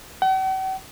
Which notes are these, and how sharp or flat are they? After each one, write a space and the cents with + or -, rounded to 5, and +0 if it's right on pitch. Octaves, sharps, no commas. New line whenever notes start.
F#5 +45